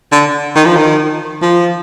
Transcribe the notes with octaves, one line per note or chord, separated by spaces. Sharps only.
D3
D#3
F3
D#3
F3